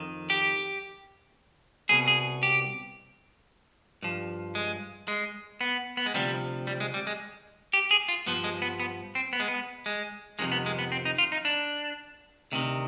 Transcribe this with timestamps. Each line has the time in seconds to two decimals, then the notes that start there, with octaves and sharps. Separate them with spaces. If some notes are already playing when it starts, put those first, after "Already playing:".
Already playing: F2 D#3
0.30 G4
1.89 C2 B2 G#4
2.08 G#4
2.43 G4
4.03 G2 F3
4.55 G#3
5.08 G#3
5.61 B3
5.97 B3
6.06 G#3
6.14 D2 C3 F3 G3
6.67 G3
6.80 G#3
6.94 G3
7.07 G#3
7.73 G4
7.91 G#4
8.08 F4
8.26 G2 F3 B3
8.44 G#3
8.62 B3
8.80 B3
9.15 C4
9.33 B3
9.40 G#3
9.48 B3
9.86 G#3
10.39 F2 C3 D#3 G#3
10.52 B3
10.66 G#3
10.79 B3
10.92 C4
11.05 D#4
11.18 F4
11.32 D#4
11.45 D4
12.52 D2 C3 D#3